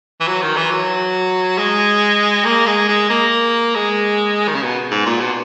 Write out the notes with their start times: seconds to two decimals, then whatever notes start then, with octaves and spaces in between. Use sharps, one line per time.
0.20 E3
0.27 F#3
0.42 D#3
0.57 E3
0.71 F#3
1.58 G#3
2.45 A#3
2.66 G#3
2.88 G#3
3.10 A#3
3.75 G#3
4.48 D#3
4.55 C#3
4.63 B2
4.91 G#2
5.06 A#2
5.20 B2